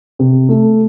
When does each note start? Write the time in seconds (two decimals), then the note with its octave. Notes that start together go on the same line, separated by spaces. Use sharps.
0.19 C3
0.49 A3